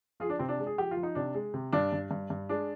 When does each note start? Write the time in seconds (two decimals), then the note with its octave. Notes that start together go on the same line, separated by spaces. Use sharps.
0.20 F3 F4 G#4
0.30 D4
0.39 C3 C4
0.49 D4
0.59 G#3
0.67 G#4
0.78 F3 G4
0.91 F4
0.97 F3
1.03 D#4
1.15 C3 D4
1.34 G#3
1.54 C3
1.73 G2 D4
1.93 G2
2.11 G2
2.30 G2
2.49 G#3 D4